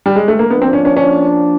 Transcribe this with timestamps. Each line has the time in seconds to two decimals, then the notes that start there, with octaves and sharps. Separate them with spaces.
0.06 G3
0.16 G#3
0.28 A3
0.39 A#3
0.50 F3 A#3 B3 D4
0.62 C4
0.73 C#4
0.85 C#4
0.96 C#4